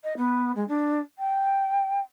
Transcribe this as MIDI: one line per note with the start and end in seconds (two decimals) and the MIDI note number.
0.03 0.13 75
0.17 0.51 59
0.55 0.64 56
0.68 0.99 62
1.18 1.99 79